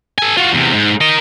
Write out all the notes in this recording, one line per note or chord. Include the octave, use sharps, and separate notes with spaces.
A4 G#5
F4 F#4
E2 C3
G#2
A#4 D#5